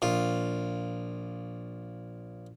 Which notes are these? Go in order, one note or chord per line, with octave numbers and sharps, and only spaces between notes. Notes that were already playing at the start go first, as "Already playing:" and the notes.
A#1 F4